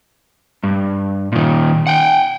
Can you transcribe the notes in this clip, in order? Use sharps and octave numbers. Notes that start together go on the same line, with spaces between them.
G2
A#2 D#3
F#5 G5